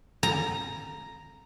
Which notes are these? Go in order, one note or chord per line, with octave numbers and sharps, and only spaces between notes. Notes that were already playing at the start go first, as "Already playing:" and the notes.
A#5